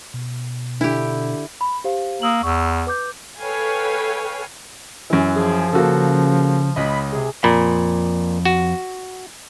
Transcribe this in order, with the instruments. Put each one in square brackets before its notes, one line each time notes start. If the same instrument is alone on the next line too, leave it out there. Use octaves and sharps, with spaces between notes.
[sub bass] B2
[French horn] D3 [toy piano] D4 [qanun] E4 G4
[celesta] B5
G4 C5 F5
[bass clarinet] A#3 [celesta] D#6 E6 F#7
[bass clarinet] E2 [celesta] C#6 E6
[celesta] B4 D6 G6
[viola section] A4 B4 C#5 F5 G5 G#5
[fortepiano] F#2 E3
[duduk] F3 [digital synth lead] G#4
[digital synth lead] C#3 [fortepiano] A#3 F#4 A4
[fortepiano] C#2 D#5 [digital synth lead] B5
[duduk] C3 [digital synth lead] G#4
[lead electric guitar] F2 B5 [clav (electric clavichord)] A#2
[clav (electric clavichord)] F#4